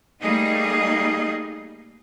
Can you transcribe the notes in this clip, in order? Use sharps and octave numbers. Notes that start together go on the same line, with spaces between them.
G3 A3 A#3 D#4 G#4 D#5